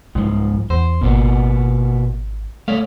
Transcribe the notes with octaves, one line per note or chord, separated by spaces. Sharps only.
C2 G#2 F3
E2 C5
G#1 B2 A#3 B3
A3 C#5 D5 F5